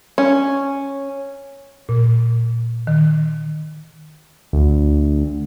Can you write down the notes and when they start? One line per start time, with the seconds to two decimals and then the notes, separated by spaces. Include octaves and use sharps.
0.18 C#4
1.89 A#2
2.87 D#3
4.53 D2